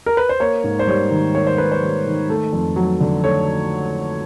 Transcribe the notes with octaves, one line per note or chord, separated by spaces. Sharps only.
A#4
B4
C5
A#3 C#5
G#2
C5
G3 C#5
D#3
A#3 C#5
C5
G#2 B4
C5
G3
D#3
A3
F2
F#3
D3
A3 C#5